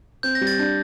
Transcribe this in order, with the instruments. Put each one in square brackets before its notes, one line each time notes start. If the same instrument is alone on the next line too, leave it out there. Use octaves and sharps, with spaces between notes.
[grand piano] C4 [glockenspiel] G6
[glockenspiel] A#6
[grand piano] G3
[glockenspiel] A6
[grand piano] D4 [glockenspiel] G6